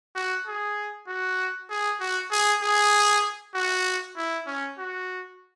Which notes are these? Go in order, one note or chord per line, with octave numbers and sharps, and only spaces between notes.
F#4
G#4
F#4
G#4
F#4
G#4
G#4
F#4
E4
C#4
F#4